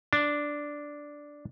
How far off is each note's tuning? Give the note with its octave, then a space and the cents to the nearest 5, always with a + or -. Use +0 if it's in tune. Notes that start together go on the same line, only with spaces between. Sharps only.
D4 -5